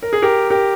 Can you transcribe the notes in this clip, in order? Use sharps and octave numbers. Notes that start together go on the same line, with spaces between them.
A#4
G#4
G4 A#4
G4 A#4